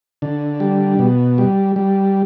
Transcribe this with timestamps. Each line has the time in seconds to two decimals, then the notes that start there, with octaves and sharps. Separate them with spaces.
0.22 D3
0.60 G3
0.99 B2
1.38 G3
1.76 G3